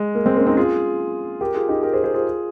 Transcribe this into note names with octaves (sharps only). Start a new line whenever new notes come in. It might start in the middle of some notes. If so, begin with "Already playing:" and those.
Already playing: G#3
A#3
G#3 C4
A#3 C#4
C4 D#4
F4 G#4
G4 A#4
F4 G#4
D#4 G4
G4 A#4
G#4 C5
G#4 C5
F4 G#4